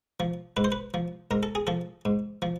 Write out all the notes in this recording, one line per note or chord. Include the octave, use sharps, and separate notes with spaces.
F3
G#2 B4
C5
B4
F3
G#2 A#4
A4
G#4
F3 A4
G#2
F3